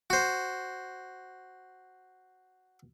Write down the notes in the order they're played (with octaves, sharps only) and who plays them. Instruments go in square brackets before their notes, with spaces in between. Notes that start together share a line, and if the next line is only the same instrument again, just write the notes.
[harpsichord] F#4 C5